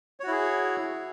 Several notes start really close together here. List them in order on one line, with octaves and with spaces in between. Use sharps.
C#5 F#4 E4 G#4